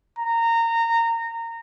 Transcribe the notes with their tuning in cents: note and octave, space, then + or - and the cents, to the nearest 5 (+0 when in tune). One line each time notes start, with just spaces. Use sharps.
A#5 -20